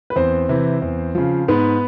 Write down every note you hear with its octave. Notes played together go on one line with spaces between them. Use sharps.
B4
E2 C4 C5
C3 E3
E2
C#3 F3
G#2 B3 B4